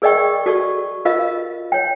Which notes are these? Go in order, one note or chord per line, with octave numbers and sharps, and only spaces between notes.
G#4 A#4 D5 D#5 G5 C#6
F#4 A4 D5 C#6
F4 A#4 D#5 F5
C#5 G5